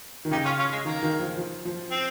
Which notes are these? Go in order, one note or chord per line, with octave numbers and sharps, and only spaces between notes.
D#3
C#3 D#4 G4
C#4 F4
C#4 F4
G#3
D#3 A#3
D#3
F3
F3
F3
C4